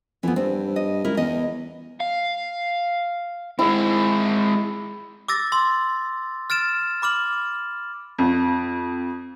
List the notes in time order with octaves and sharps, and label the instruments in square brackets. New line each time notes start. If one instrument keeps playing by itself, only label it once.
[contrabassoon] F2 [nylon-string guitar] E3 B3
[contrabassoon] G2 [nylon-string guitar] C4
[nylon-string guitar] D#5
[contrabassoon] C#2 [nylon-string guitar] E4 A#4
[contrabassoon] E2 [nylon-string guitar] D#5
[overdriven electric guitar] F5
[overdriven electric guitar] G#3 C4 [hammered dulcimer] E4
[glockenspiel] D6 E6 A6 A#6
C6 E6 A6
F6 A6 D7 E7
B5 D6 F6 F#7
[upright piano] F2